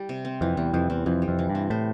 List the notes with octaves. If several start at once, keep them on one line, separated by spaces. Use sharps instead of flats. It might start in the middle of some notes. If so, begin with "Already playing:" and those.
Already playing: G3 G4
C3
C4
F2 E3
E2 G3
F2 E3
E2 C4
F2 E3
G3
F2
E3
G2
C4
A2 C5